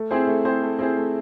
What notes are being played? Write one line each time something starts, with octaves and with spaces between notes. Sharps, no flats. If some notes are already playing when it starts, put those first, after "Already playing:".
Already playing: A3
C4 E4 G#4 C5
A3
C4 E4 G#4 C5
A3
C4 E4 G#4 C5
A3